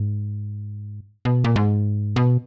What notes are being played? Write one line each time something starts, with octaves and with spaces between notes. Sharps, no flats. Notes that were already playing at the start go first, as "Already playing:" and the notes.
Already playing: G#2
B2
A#2
G#2
B2